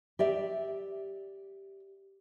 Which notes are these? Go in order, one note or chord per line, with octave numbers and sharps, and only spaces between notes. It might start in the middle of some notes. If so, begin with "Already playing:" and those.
G4 D5 E5